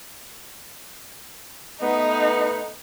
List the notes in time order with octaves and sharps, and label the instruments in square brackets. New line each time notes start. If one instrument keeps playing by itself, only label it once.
[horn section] A3 B3 [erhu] D#4